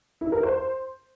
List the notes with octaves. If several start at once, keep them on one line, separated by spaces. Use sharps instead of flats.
E4
A#4
C5